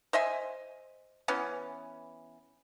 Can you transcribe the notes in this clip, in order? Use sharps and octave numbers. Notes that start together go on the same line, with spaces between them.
C5 D#5 E5 G#5
E3 B3 C#4